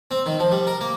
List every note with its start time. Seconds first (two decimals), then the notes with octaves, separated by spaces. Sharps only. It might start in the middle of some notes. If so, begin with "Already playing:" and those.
0.11 C4
0.26 D#3
0.39 F3
0.52 G3
0.67 A#4
0.81 A#3